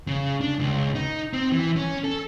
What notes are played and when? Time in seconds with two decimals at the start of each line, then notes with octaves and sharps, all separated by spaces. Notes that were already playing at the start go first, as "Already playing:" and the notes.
0.08 C#3
0.41 D4
0.59 C#2
0.95 D#4
1.33 C4
1.52 E3
1.76 C#4
2.04 A4